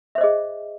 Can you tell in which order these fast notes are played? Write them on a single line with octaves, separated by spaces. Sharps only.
E5 C5 D#5 G#4